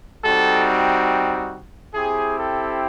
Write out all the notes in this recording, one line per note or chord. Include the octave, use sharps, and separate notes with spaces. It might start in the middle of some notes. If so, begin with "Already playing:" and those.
G3 C4 D#4 F#4 A4
C4 E4 G4 G#4
A4